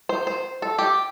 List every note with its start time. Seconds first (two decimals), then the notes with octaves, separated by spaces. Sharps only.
0.09 C5
0.27 C5
0.62 A4
0.78 G4